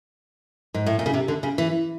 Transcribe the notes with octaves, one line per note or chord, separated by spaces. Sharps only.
G#2
A2
A#2
C#3
C3
D3
C#3
E3